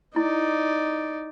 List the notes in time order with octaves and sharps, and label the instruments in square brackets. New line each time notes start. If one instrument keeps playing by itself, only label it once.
[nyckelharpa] D#4 D5 [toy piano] E4